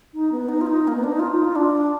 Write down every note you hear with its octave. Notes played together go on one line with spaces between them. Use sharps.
D#4
B3
D#4
F4
D#4
A#3
B3
D4
D#4
F4
D#4
F4
D4